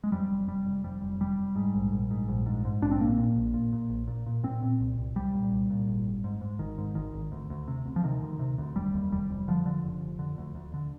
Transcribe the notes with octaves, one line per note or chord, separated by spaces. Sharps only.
G#3
F2 G3
F1
F1 G3
F1
F2 G3
F1
F1 G3
F1
G#2
A#1
A#1
G#2
A#1
G#2
G#2
A#1 D4
C4
A#2 A#3
A#2
A#1
A#2
A#2
A#1
A#2
A#2
A#2 C4
A#2
C2
C2
C2 G3
A#2
C2
A#2
G#1
G#1
G#2
G#2
G#1 D#3
G#2
G#1 D#3
G#1
D2
D2
C3
D2
F3
C3 D#3
D2
C3
D2
F1 G3
D#2
F1 G3
F1
D3 F3
D3
F1
F1
D3
D2
D2
D3